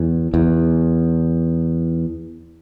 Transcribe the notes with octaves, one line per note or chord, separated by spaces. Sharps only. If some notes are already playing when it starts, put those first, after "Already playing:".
Already playing: E2
E2